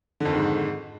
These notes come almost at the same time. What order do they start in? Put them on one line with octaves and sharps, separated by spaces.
D3 F2 D#3 G#2